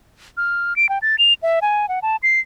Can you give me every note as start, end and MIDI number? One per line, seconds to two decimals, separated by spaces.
0.37 0.76 89
0.76 0.89 98
0.89 0.98 79
1.02 1.16 93
1.19 1.34 101
1.43 1.60 76
1.62 1.88 80
1.89 1.99 78
2.02 2.16 81
2.23 2.40 96